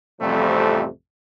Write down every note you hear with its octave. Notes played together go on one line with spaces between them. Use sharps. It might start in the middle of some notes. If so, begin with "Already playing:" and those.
A1 F2 C3 F3 G3 A3